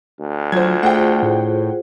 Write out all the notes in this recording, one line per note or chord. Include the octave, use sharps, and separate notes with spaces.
D2
F#3 F4 C5 G#6
A3 F4 G#4 C5 F#5 G5
A2